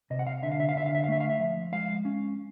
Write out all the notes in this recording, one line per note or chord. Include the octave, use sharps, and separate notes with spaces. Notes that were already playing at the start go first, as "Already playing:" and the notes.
C3 D#5
F#5
F5
D3 E5
F5
E5
F5
D3 E5
F5
E5
F5
A3 E5
F5
E5
F3
G#3 F5
C#4